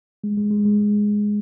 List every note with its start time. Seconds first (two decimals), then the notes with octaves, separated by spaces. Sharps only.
0.24 G#3
0.37 G#3
0.50 G#3
0.65 G#3